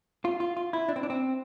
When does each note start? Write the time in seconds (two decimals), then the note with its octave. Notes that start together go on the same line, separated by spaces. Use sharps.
0.25 F4
0.40 F4
0.57 F4
0.73 E4
0.89 D4
0.96 C4
1.03 D4
1.10 C4